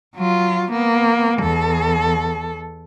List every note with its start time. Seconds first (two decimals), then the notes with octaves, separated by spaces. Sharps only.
0.15 F#3 F4
0.71 A#3 B3
1.40 E2 A4